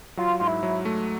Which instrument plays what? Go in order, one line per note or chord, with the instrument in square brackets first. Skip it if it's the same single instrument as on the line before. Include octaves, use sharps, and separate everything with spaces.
[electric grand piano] F#3 [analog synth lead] F4
[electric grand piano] G#2 [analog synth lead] F4
[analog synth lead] E4
[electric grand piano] F#3
A3